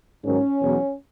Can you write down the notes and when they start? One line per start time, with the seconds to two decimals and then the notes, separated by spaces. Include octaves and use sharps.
0.24 G#2 D#3 F#3 C#4
0.61 E2 B2 F#3